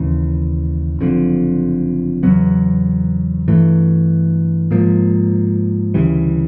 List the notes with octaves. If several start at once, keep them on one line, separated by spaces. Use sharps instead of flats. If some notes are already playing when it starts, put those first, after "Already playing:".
Already playing: D#2 C#3 E3
F#1 F2 D3 F3
E2 C#3 F#3 B3
G2 E3 A3
G#2 F3 A#3
D2 C#3 E3 G3